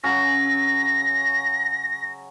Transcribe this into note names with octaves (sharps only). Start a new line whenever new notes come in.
C#3 F#3 C#4 A#6